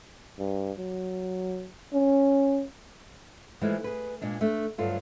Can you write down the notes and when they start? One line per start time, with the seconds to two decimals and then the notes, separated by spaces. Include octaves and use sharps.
0.39 G2
0.78 F#3
1.94 C#4
3.61 E3 F3 G#3 A3
3.84 G#4 B4
4.22 A#2 G#3 D4
4.41 A3 D4
4.78 D2 G2 F#3 F4 A4